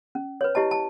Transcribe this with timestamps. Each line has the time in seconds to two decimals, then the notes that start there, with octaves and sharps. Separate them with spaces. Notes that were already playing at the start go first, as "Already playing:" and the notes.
0.15 C#4
0.41 B4 C#5
0.55 E4 G4 D#5 A5
0.71 A5